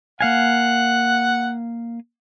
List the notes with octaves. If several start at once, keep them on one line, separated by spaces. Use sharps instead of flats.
A#3 F5 F#5 G#5